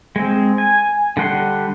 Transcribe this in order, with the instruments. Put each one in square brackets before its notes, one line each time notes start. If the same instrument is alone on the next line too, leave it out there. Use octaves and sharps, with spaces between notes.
[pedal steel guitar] G#3 C4
G#5
D3 G3 F#5 C6